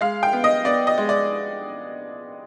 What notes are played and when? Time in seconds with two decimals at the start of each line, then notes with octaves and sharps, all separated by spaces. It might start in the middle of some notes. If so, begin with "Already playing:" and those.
0.01 G#3 F5
0.23 G5
0.33 B3
0.44 D#5
0.65 B3 D5
0.87 D#5
0.98 G#3
1.09 D5